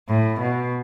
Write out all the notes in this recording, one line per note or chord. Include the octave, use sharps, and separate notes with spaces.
A2
B2